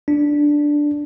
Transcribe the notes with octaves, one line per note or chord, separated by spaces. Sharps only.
D4